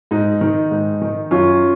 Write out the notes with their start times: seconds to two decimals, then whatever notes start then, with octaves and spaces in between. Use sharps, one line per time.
0.11 G#2 D#4
0.41 D#3
0.71 G#2
1.02 D#3
1.31 F#2 C#4 F4